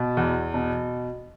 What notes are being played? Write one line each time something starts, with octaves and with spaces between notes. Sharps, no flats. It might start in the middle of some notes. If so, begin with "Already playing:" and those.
Already playing: B2
E2
B2